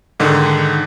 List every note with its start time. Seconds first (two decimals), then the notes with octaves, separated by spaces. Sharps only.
0.20 G#2 D3 D#3